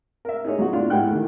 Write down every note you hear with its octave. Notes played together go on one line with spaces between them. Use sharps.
A#4 E5
D#4 G#4 C#5
F#3 F4 F#4
D4 E4 F4 F5 C6
G#2 E4 G4 F#5 G5 F#6
D#3 E3 A3